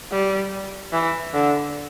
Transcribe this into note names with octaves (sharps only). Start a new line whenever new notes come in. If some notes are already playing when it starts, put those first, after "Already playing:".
G3
E3
D3